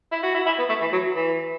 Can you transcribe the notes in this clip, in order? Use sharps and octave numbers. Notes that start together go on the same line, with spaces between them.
E4
F#4
E4
E4
B3
A3
E3
F#3
E3